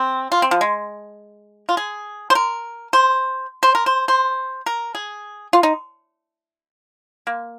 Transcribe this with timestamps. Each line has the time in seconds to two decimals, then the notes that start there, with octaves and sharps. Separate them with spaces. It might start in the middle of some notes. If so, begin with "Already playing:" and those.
Already playing: C4
0.32 F4
0.42 C4
0.51 F3
0.61 G#3
1.69 F4
1.77 G#4
2.30 C5
2.35 A#4
2.93 C5
3.63 C5
3.75 A#4
3.86 C5
4.08 C5
4.66 A#4
4.95 G#4
5.53 F4
5.63 D#4
7.27 A#3